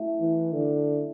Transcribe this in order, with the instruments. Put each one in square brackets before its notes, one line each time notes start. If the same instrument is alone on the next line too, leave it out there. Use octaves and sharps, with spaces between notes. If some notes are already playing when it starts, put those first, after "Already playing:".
Already playing: [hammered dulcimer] A2 F#3 A3 C#4
[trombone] E3
D3